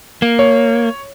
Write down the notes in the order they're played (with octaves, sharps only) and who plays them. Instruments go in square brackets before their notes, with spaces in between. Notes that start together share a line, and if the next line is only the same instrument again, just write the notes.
[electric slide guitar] A#3
[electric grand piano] C#5